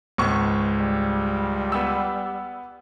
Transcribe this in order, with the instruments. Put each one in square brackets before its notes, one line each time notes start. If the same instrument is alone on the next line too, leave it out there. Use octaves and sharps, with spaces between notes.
[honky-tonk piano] G#1 C#6 [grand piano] C#2
[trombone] G3
[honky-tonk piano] B3 E6